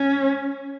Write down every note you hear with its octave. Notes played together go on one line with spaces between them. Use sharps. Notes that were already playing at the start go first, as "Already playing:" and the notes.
Already playing: C#4